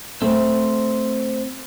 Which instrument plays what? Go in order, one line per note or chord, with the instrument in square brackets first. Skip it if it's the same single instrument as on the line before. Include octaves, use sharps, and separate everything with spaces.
[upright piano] A3 [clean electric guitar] C4 C5